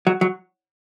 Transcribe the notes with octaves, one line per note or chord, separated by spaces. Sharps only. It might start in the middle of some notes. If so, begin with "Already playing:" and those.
F#3
F#3